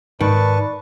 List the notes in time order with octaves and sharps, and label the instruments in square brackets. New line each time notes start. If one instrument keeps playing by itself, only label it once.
[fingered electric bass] G#2 [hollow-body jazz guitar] D#3 [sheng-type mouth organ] B4 A5 C#6 [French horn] D5